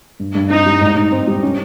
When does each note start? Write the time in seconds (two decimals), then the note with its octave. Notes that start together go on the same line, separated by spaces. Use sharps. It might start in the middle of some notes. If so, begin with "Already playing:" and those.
0.20 G2
0.35 G2
0.50 C4 D#4
0.66 G3
0.81 G#2
0.97 G#2
1.12 C4
1.27 G3
1.43 C#4